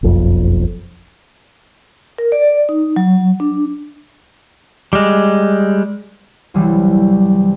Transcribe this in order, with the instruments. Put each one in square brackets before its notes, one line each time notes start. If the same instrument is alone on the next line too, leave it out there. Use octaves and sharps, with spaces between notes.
[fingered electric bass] F#1 B1 F2
[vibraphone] A#4
D5
D#4
F#3
D4
[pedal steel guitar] G3 G#3
[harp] C2 E3 F#3 G3